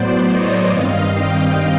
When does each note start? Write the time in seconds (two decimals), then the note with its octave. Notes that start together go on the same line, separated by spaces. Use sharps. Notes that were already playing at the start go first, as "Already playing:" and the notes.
Already playing: A2 F#3 B3 C5 D5
0.26 C#5 D#5
0.68 G2 D#3 G3 C4 D#5 F5
1.11 F5 G5